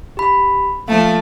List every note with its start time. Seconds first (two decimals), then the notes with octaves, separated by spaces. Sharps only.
0.17 G4 B5
0.88 F3 A3 F5 A5